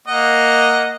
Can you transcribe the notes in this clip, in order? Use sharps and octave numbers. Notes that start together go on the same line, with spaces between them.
A#3 D#5 F#5